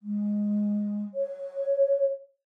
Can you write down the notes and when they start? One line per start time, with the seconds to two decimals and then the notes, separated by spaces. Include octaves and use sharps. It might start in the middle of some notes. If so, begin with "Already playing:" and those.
0.03 G#3
1.14 C#5